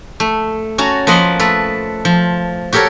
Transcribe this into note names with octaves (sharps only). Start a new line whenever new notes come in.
A3
C#4 F#4 A5 A#5
F3 A#3 B4 D#5 F#5 C6
A3 A4 B4
F3
F#4 G4 A4 A#4 C#5